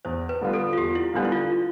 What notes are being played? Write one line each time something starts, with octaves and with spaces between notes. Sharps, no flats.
E2 C5
B4
D3 G3 B3 F4
A4
F4
E2 G4
E4
D3 G3 B3 D4 F4
E4
F4